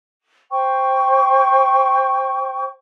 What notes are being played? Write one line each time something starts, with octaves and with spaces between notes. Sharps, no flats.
C5 G5 C#6